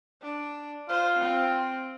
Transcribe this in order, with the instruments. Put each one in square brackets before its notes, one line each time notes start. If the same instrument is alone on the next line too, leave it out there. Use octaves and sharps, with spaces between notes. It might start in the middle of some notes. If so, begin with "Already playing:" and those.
[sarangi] D4
[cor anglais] F4 [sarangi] C5
[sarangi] C4